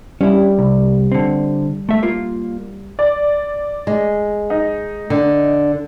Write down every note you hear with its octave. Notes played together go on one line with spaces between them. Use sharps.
G3 C#4 E4
C2
D3 C4
A3 E5
A#3 F4
D5
G#3
D#4
D3